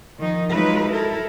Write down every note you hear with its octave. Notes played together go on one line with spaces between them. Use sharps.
D#3 F3 D#4
F#3 G#3 D#4 F4 B4 E5
E4 A4 A#4